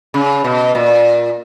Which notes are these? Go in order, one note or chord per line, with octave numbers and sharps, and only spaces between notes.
C#3
B2
A#2